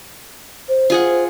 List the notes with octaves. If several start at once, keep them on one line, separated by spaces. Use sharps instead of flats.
C5
F4 G#4 F#5